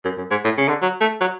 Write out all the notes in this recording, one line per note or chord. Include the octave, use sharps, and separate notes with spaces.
F#2
F#2
G#2
A2
C#3
D3
F#3
A3
F#3